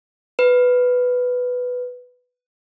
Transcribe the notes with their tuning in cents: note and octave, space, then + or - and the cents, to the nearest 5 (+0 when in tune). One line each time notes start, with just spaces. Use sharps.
B4 +5